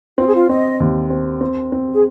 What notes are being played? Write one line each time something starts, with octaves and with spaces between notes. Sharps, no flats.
C4 F4
G#4
F4
C4 D#5
D#2
C4
C4
C4
G#4